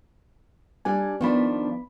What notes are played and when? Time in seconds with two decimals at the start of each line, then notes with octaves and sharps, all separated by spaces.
0.85 G3 D4 D5 G#5
1.21 D#3 F3 B3 D4 B5